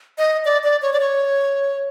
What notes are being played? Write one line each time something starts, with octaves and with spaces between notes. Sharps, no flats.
D#5
D5
D5
C#5
D5
C#5